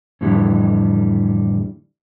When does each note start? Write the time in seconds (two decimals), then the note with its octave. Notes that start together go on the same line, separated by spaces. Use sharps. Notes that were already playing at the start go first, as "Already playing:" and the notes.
0.21 F2 A2 D3 E3 G3